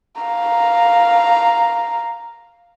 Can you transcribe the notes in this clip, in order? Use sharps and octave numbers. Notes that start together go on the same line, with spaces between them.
F5 A#5